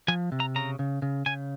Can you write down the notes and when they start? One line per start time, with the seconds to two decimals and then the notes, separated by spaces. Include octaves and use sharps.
0.08 F3 G#5
0.32 C3
0.40 A#5
0.56 C#3 A#5
0.79 C#3
1.02 C#3
1.26 C#3 G#5